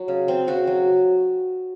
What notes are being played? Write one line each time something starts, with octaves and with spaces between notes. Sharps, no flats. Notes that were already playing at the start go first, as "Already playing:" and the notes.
Already playing: F#3
C#3
C4
C#3 F#4
F#3